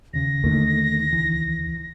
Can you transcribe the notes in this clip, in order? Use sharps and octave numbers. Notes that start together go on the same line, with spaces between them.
D#2 C#3 A#6
D#2 D3 D#3 A3 A#3 D#4
C#2 E3